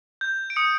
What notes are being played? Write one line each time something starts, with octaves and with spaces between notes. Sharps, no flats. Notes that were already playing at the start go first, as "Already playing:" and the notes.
G6
D7
D#6 C#7